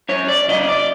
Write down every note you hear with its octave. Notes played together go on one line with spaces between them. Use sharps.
F#2 C#5
D5
C#3 F#3 D#5
D5